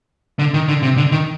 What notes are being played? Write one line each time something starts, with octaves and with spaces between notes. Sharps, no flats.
D3
D#3
D3
C3
D3
D#3